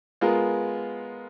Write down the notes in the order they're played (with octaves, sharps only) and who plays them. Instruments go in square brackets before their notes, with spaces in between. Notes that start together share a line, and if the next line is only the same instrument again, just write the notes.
[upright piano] G#3 B3 F4 A#4